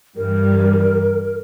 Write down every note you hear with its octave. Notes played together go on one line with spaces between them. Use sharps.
G2 E3 G3 A#4